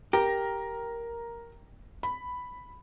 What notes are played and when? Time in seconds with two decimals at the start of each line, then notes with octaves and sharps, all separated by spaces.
0.13 G4 A#4 A#5 A#6
2.03 B5